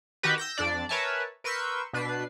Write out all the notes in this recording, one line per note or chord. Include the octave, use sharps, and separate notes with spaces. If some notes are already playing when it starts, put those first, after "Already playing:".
D#3 F#4 G4 B4
E6 G6 A#6
F2 D4 D5
A#4 B4 C#5 E5 G#5 A5
A#4 B4 C6 C#6 E6 G6
B2 D4 B4 C7